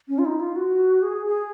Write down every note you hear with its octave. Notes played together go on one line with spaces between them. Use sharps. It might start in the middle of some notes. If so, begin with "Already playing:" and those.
C#4
F4
D#4
F4
F#4
G#4
G#4